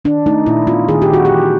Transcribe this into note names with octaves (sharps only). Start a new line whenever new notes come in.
D#3 D4
A3 D#4
A#2 E4
B3 F4
D#3 G#4
G4
D#3 F#4
G4
E3